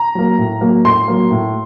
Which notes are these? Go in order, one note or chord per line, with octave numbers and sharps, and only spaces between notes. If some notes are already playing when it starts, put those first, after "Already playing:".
Already playing: A#5
F#3 A#3
A2
F#3 A#3
A2 C6
F#3 A#3
A2